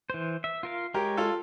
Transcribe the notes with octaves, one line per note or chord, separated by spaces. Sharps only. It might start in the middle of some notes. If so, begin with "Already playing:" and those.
E3 C5
E5
F4 A#4 F5
G#3 G4 A#4 C#5
F4 A4